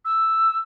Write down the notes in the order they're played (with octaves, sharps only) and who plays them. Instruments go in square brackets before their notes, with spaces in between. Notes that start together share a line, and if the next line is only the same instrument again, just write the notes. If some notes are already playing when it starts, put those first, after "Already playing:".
[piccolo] E6